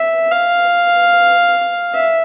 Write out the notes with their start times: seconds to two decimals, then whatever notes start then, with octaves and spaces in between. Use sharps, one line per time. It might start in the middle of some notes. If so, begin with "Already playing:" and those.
Already playing: E5
0.31 F5
1.94 E5